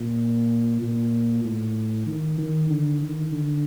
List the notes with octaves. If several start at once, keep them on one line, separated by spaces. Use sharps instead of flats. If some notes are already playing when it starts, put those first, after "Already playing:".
Already playing: A#2
A#2
A2
D#3
D#3
D3
D#3
D3